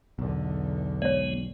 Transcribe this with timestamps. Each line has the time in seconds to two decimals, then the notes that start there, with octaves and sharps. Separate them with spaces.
0.19 B1 E2 D3
1.02 G#3 B3 C#5 D5